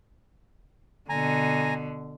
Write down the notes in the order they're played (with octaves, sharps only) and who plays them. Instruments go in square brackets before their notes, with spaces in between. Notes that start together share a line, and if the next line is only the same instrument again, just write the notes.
[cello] B2 D3 [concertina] G#5 A#5